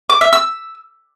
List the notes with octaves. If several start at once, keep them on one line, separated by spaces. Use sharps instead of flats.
D6
E5
E6